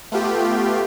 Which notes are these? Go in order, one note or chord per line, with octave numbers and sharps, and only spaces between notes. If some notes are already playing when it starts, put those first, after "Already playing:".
A3 B3 F4 G4